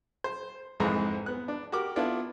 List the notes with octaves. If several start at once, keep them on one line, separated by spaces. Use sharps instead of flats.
C5
A#1 F2 G#2 E3 G#3 A#5
B3 F#6
D4
F#4 G4 A#4 D6
B3 D4 E4 F4 A4